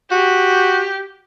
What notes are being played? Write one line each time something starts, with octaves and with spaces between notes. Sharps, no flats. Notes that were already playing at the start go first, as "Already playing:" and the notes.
F#4 G4